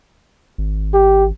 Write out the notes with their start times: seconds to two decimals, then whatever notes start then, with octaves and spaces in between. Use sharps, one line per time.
0.58 G#1
0.94 G4